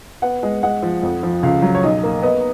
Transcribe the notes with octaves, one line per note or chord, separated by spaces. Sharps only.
B3 F#5
G#3
G#3 F#5
F3
F2
F3
C#2 F5
F#3
C#5
B1 D#5
A#3
B3 D#5